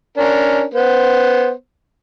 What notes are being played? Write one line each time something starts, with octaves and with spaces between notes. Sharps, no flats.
C#4 D4 A#4
B3 C5